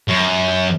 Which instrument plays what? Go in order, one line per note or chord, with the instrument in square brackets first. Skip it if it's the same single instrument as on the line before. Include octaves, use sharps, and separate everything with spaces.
[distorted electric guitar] F#2